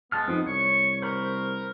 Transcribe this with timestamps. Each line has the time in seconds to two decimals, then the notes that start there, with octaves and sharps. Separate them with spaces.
0.12 G#3 B3 A5 F6
0.28 F2 C4 D#4
0.46 C2 C#5 C#6
1.02 A#4 C5 B5 C#6